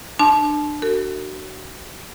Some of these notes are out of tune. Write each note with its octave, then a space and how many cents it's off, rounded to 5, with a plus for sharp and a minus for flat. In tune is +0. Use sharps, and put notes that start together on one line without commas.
D4 +25 A5 -25 C6 +20
F#4 +25 A#4 -45